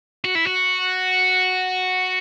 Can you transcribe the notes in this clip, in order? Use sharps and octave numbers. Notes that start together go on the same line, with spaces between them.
F#4
E4
F#4